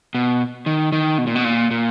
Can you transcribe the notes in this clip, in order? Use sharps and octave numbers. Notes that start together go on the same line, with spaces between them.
B2
D#3
D#3
B2
A#2
B2
A#2
A#2